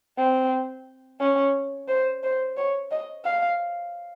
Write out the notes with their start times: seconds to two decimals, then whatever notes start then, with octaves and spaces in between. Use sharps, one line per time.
0.18 C4
1.20 C#4
1.88 C5
2.23 C5
2.56 C#5
2.91 D#5
3.25 F5